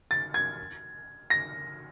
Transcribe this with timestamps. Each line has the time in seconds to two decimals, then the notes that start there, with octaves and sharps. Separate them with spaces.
0.11 A6
0.34 G#6
1.30 A#6